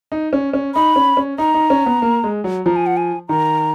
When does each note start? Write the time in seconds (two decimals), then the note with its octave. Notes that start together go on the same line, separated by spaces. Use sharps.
0.12 D#4
0.33 C#4
0.53 C#4
0.75 D#4 B5
0.96 C#4
1.17 C#4
1.38 D#4 A#5
1.54 D#4
1.70 C#4
1.86 B3
2.02 A#3
2.24 G#3
2.44 F#3
2.66 F3 A#5
2.76 G#5
2.86 F#5
2.97 G#5
3.28 D#3 A#5